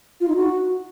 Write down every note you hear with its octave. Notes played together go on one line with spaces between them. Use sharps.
F4
D#4
F#4